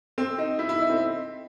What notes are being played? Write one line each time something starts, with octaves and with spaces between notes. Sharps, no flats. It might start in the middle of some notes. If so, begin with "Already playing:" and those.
C4
D#4
E4
E4
D#4
C4